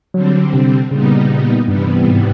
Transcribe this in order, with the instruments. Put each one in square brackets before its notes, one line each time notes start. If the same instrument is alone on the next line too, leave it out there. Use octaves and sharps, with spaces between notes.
[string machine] D3 G3 C4 [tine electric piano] F#3
[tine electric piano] C3
[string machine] A#2 G3 B3 D#4 [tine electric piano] C#3
[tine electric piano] G2 [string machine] C3 E3 G3 B3
[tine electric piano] G#2